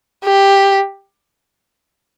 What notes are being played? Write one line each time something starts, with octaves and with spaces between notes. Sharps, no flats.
G4